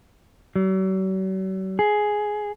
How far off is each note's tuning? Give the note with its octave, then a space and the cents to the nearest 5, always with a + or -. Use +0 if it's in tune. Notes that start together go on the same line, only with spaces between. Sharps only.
F#3 +45
G#4 +10